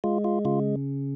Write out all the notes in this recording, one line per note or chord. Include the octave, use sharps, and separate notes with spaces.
G#3 F4
F4
C#3 F4